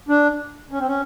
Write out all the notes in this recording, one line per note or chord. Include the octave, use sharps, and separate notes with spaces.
D4
C#4
C4
C#4